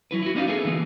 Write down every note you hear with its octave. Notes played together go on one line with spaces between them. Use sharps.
F#3 E4 B4
E4 F#4
A#3 C#4 D#4 D5 D#5 F5
G#4 A4 B4 E5
D3 E3 A#3